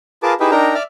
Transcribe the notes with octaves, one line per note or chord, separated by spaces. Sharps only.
F4 G#4 A#4 B4 A5 D6
D#4 E4 G4 G#4 B4 E5
D4 D#4 A#4 G5 A#5
D5 E5 D6 F6